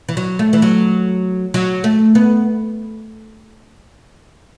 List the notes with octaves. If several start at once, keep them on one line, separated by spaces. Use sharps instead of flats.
E3
F#3
A3
E3
F#3
F#3
A3
B3